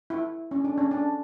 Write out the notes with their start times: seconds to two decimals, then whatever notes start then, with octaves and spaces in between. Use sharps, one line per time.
0.10 E4
0.51 C#4
0.64 D4
0.78 C#4
0.91 D4